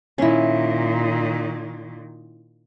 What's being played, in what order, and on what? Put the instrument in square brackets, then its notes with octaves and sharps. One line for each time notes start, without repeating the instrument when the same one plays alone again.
[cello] A#2 D#3 [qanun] C#4 E4